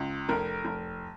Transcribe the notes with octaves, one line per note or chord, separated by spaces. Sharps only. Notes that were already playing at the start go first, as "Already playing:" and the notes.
Already playing: C#2
F1 A#4
F1